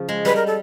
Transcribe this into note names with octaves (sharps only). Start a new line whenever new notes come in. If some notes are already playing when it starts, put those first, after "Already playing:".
Already playing: C#3 F3
G#3
G3 B4
A#4
A4